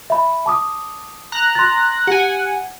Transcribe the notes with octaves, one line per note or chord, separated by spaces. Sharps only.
E5 B5
A5 D6 D#6
A#5 F#6 A#6
C6 A6
G4 F#5 G#5